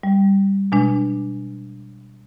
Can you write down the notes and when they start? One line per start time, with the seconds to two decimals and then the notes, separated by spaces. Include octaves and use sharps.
0.03 G3
0.72 B2 G#3 D4